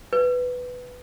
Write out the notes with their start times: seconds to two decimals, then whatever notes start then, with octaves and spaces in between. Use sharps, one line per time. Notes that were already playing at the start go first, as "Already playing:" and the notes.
0.13 B4